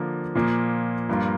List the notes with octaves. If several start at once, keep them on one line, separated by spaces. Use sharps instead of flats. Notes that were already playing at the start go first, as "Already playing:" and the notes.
Already playing: D3 F3 A#3
A#2 F3 A#3
G2 F3 A#3 F4